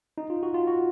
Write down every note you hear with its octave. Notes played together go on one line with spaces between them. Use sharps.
D#4
F4
F#4
F4
F#4